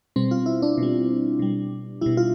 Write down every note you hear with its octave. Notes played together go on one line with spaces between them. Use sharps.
B2 G3 C4
F4
E4
D4
B2 G3
B2 G3
B2 G3 E4
F4